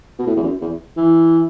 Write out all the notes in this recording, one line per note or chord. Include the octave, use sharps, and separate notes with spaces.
B2
A2
E2
F#2
E2
E3